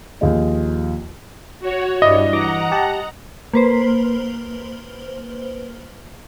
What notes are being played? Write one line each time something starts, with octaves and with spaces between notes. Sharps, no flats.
D#2 F3 F4 G#4 D#5
F#4 C#5
G2 E4 D5 D#5
E3 F#5 A#5 D6 A#6
G4 A5
A#3 B4 C5